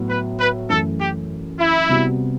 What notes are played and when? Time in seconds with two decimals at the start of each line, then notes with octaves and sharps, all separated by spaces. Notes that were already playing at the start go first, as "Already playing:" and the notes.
Already playing: A2 F#3 B3 E4
0.09 B4
0.39 B4
0.69 F#2 E3 A3 A4
1.00 G4
1.59 E4
1.89 C3 G3 B3 F#4